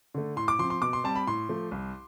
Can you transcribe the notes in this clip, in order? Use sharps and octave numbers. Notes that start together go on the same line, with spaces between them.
D3 A3
A2 C6
D6
F3 C4 C6
C6
B2 D6
C6
G3 C4 A5
B5
A2 C6
F3 A3
C2